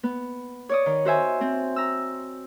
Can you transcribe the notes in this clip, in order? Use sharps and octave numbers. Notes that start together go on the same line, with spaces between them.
B3
C#5 D5 D#6
D#3
F#4 C5 E5 G#5
C4
A#5 E6